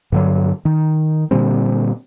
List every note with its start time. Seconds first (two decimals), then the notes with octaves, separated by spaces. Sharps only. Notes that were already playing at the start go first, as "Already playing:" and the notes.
0.12 G2 D3 F#3
0.65 D#3
1.31 A#2 D3 G3 C4